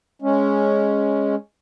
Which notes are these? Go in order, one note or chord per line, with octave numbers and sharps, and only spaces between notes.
G#3 C#4